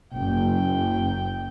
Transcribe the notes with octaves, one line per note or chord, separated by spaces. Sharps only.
F#1 F#2 G5